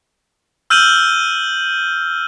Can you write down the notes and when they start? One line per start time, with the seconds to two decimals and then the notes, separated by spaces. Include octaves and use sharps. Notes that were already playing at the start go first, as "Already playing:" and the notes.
0.70 E6 F6 G6 D#7 F#7 G7